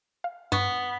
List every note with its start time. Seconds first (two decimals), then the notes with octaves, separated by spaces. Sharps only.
0.24 F5
0.52 G2 B3 C#6